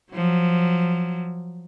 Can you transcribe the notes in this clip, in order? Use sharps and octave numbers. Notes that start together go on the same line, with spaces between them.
F3 F#3